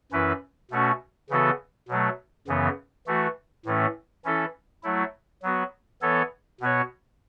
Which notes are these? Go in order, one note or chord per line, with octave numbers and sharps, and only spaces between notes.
F#2 E3 C#4 E4 B4
B2 A3 C#4 F#4
C#3 E3 B3 F#4 A4
B2 F#3 A3
F#2 C#3 E3 B3
E3 A3 F#4
A2 E3 A3 C#4
E3 C#4 E4 A4
F#3 A3 E4
F#3 B3 F#4
E3 B3 A4 C#5
B2 B3 F#4 C#5